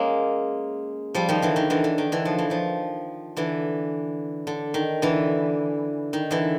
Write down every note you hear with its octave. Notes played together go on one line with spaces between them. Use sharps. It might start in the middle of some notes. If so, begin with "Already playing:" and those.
Already playing: G#3 A#3 C#4
F3 G3
D#3 F3
D3 E3
D#3
D3 E3
D3
D#3
D3 E3
F3
E3
D#3 F3
D3 E3
D3
D#3
D3 E3
D#3
D3 E3